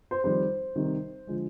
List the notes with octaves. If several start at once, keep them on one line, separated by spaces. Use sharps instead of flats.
C5
F2 D#3 G3 C5
C3 D#3 G3
D3 F3 G#3